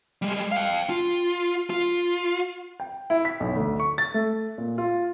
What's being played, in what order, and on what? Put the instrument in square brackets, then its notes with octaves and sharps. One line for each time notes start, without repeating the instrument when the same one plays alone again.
[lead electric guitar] G3 G#3
F5 G5
F4
F4
[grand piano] G5
E4
B6
B1
D2
C#6
A6
A3
A#2
F4